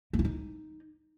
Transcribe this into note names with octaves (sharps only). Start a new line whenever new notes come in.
A#3
E4
D#4